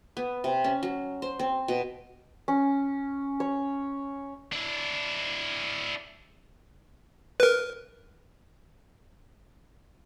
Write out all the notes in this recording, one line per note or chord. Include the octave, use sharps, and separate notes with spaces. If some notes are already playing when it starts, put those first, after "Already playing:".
B3
C3
C#4
F#3
C5
C4
B2
C#4
C#5
D4 E4
A#4 B4